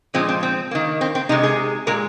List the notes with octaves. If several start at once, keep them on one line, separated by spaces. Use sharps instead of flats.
A#2 F3 G#3 C4
C4
C4
D#3 A#3
C4
C4
C3 G#3 D#4
G#4
A#2 G#3 A#4